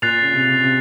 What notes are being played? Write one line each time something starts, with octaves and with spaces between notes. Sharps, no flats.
A#2 F#6 A6 C7 F7
C#3
C3
C3